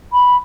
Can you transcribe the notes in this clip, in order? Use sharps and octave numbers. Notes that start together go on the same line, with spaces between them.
B5